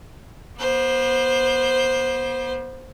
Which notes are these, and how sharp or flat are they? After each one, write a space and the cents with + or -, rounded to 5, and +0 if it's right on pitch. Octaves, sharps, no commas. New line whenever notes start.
B3 -35 C5 +0